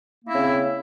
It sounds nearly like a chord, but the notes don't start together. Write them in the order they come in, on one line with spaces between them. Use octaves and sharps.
A#3 E4 C4 C#3